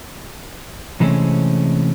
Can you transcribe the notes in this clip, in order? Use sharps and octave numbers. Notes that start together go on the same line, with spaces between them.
C3 E3 G#3 A3 C4 C#4